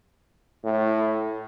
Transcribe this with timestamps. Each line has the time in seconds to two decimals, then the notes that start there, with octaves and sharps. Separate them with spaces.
0.64 A2